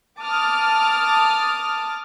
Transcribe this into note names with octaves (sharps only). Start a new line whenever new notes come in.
A5 D6 D#6 F6